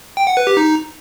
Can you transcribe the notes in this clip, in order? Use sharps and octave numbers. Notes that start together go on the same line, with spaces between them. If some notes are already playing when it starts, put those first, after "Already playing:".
G5
F#5
B4
G4
D#4